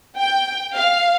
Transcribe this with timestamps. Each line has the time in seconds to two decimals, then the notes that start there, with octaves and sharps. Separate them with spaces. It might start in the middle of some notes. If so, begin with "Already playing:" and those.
0.16 G5
0.76 F5